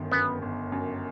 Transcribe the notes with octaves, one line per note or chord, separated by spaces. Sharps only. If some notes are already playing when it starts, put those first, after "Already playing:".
Already playing: G1 F#2 D#3
F#2 B3
G1
F#2